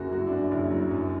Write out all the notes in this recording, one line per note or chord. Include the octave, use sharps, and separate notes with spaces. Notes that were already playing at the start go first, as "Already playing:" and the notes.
Already playing: F#1 F#2 F#4
F#2 F#4
E4
D4
F#2 E4
F#1 E4
F#3
F#2